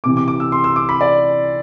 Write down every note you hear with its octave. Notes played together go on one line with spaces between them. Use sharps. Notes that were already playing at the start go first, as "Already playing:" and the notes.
C3 E3 D6
D6
D6
E6
C6
E6
D6
B5
D5